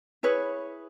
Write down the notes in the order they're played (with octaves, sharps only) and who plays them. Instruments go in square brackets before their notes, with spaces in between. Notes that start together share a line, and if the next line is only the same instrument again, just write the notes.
[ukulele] E4 G#4 B4 C#5